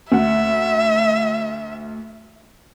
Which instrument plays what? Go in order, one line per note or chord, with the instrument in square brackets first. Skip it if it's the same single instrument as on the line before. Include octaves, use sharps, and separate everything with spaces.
[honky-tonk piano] D2 F#5 [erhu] E5